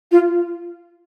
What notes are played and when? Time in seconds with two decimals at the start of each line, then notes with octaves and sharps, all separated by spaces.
0.12 F4